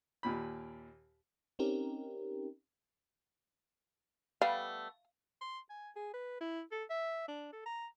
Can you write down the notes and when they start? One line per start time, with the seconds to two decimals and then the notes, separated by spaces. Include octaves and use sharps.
0.23 D#2 A#2 B5
1.59 C4 C#4 D#4 G4 A#4
4.41 G3 A3 B3 F5
5.41 C6
5.70 G#5
5.96 G#4
6.14 B4
6.41 E4
6.71 A4
6.90 E5
7.28 D4
7.53 A4
7.66 A#5